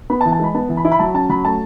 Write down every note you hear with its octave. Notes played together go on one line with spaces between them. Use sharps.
B3 B5
A5
E3
A5
G#3 B5
B3 A5
E3
B5
E4
B5
F#3 A5
C#4 A5
F#3 B5
A3 A5